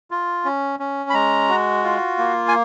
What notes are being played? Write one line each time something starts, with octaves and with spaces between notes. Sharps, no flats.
F4
C#4
C#4
B5
G#3 A#5
F#4
F4
A#3
G#5